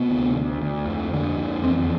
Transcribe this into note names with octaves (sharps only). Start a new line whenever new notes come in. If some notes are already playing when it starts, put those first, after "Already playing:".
Already playing: C3 B3
D2
D2
D2
F2
D3
F2
E2 C4